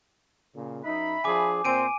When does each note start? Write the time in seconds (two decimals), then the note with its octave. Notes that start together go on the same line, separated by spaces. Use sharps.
0.55 A#2 C#3
0.85 F#2 D#4 E5 B5
1.24 F3 D4 G#4 G#5 D6
1.65 A#2 A3 C4 C5 G#5 D7 D#7